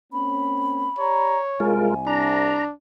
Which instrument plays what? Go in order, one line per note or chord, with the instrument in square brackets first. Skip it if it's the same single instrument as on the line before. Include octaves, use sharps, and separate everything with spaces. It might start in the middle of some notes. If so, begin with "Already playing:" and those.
[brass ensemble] A#3 C4 C#4 [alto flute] B5
[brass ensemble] G4 D5 A#5 [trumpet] C#5
[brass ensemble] C2 [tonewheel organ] G#3 F4 A#4 [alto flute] G#5
[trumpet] D4 [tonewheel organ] A#5